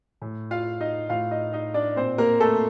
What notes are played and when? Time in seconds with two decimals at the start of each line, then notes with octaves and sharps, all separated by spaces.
0.22 A2
0.51 F4 F5
0.81 D#4 D#5
1.10 A2 F4 F5
1.31 D#4 D#5
1.53 D#4 D#5
1.74 D4 D5
1.96 A#2 C4 C5
2.18 A#3 A#4
2.40 A3 A4